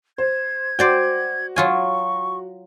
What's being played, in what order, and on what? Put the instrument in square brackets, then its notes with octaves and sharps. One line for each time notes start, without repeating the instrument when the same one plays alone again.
[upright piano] C5 [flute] G#6
[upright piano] F#4 [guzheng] C5 D5 G5
[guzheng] F#3 F4 G#5 [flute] C#6